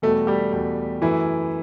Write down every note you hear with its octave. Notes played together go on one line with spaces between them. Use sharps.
E2 B2 G3 A3 A4
G3 G4
E2 B2 G3
F#2 E3 A3 E4